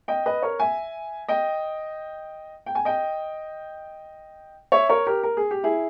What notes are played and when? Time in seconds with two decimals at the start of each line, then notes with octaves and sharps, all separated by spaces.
0.08 D#5 G5
0.26 B4 D#5
0.42 A#4 C#5
0.60 E5 G#5
1.28 D#5 G5
2.66 G5
2.75 G#5
2.85 D#5 G5
4.72 C#5 E5
4.89 A#4 C#5
5.06 G4 A#4
5.23 A#4
5.37 G#4
5.51 G4
5.64 E4 G#4